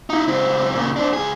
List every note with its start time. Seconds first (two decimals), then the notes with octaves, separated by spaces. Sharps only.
0.10 D#4 E4
0.28 C#2 C4
0.75 A#2 C#3
0.96 C4 D4
1.13 C#2 G#4